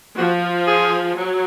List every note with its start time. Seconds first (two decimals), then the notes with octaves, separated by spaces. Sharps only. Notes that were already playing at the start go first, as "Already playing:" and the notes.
0.16 F3 F#4
0.67 G#4
1.17 F#3